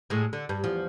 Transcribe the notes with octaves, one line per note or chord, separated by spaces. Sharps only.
A2 G#3
D3
G2
E2 F3